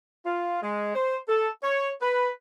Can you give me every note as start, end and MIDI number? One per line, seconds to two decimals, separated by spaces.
0.25 0.58 65
0.61 0.92 56
0.94 1.16 72
1.28 1.49 69
1.62 1.90 73
2.01 2.29 71